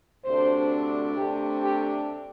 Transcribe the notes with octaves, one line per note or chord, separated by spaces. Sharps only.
D2 C3 A3 D4 C5
C3 A3 D4 G4
G4